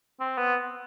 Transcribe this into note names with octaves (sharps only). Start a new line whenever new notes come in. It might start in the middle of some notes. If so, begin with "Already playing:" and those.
C4
B3